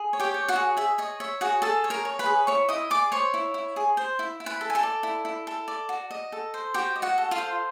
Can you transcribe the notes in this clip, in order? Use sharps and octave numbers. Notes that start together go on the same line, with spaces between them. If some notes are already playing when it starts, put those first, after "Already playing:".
Already playing: G#4
C#5
G4 G5
C#5
F#4 F#5
G#4
G#4 E5
C#5 D#5
C#5 E5
F#4 G#4 F#5
G#4 A4 A5
C#5
A#4 A#5
C#5
B4 B5
G#4
E4 C#5 C#6
E4 D#5 D#6
G#4 D5 D6
C5 C#5 C#6
E4
E4
G#4
C5
E4
E4
B4 B5
A4
G#5
A4 A5
D5
E4
E4
A4
D5
F#4
D#5
A4
C5
F#4 G4 G5
D#5
F#4 F#5
A4
F4 F5
C5